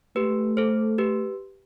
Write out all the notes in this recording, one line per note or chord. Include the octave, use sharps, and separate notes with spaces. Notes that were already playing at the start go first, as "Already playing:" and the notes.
A3 G4 B4
A4 C5
G4 B4